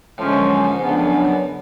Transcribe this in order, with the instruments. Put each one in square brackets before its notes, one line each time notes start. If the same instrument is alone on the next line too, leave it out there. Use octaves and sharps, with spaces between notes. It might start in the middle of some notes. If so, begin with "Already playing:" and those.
[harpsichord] A2 [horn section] D3 F3 G#3 C#4
[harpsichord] F#2
F#2
G#2
[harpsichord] G#2 [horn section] C#3 F3 B3 D4
[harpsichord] F2
F#2
F#2
F#2